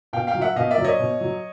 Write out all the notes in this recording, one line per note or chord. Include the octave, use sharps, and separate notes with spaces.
B2 F5 G5
F5 G5
F#3
E5 F#5
B2 D#5 F5
D5 E5
F#3
C#5 D#5
B2
F#3